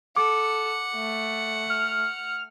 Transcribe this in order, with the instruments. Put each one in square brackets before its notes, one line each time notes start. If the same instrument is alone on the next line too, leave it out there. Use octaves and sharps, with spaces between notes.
[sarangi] A4 [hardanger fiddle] F#5 [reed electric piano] D6
[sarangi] A3
[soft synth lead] F6